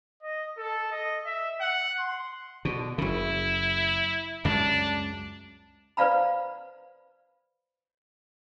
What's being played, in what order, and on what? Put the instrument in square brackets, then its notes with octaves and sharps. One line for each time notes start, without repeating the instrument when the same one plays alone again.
[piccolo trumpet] D#5
A4
D#5
E5
F#5
C6
[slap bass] B2 [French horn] D3
[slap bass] F#1 C#3 [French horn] E4
[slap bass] C#2 F#2 C#3 [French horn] D4
[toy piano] B4 C5 D5 F5 A#5 B5